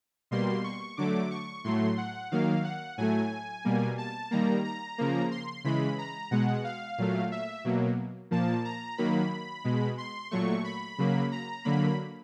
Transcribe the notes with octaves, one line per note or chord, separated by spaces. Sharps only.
B2 G3 A#3 C6
C#6
D3 F#3 A3 D6
C#6
A2 F#3 A3 C6
F#5
D#3 F#3 A#3 F5
F#5
A2 F#3 A3 G#5
B2 G3 A#3
A5
D#3 G3 A#3 A#5
A#5
C#3 F3 A#3
C6
C#3 E3 G#3 B5
A#5
B2 G#3 F#5
F5
A#2 F#3 A3
E5
B2 F#3 A#3
A#2 F3 A#3 A5
A#5
D#3 F#3 A#3 B5
B2 G#3
C6
A#2 F#3 A3 C#6
B5
C#3 F#3 A#3
A#5
D3 F#3 A#3 B5